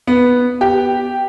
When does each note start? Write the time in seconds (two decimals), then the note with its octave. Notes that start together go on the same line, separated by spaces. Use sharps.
0.07 B3
0.61 G4